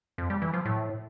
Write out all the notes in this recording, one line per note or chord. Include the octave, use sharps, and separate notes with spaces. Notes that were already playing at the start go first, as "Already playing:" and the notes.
F2
G3
E3
F3
A2